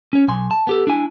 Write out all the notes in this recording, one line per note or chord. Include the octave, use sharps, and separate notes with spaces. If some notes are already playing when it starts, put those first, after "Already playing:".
C#4 C#5
B1 G#5 C6
A5
B3 G4 A4
D4 E4 G#5